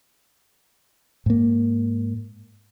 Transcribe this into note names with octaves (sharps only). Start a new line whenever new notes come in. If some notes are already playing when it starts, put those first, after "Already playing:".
G#2 A#3